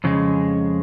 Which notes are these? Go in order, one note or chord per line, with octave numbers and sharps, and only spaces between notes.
F2 C#3 G#3